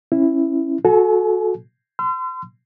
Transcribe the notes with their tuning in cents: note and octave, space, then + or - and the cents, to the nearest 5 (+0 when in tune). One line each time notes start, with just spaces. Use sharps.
C#4 -25 E4 +0
F#4 -20 A4 -15 G#5 +35
C6 -35 E6 +45